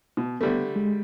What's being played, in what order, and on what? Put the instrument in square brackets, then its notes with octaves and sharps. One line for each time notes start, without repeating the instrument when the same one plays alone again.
[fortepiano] B2
[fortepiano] D3 G3 A3 [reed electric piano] B3
[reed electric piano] G#3